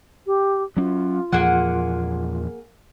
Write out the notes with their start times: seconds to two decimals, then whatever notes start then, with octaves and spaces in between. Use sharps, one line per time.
0.27 G4
0.77 F#3 C#4 F4
1.32 E2 A#2 F3 A#3 G#4 F#5